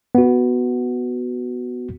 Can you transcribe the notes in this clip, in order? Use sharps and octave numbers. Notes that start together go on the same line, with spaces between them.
B3 F#4